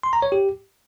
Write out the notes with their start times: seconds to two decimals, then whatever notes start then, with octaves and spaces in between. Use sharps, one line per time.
0.03 C6
0.13 A#5
0.22 C#5
0.32 G4